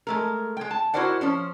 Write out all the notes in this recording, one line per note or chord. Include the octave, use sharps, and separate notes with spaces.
G#3 A3 A#4
G#3 G5
A5
E4 F#4 A#4 C5 D5 F#5
F3 C#4 C5